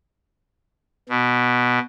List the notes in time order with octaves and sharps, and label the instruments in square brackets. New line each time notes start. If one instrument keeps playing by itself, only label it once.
[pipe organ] B2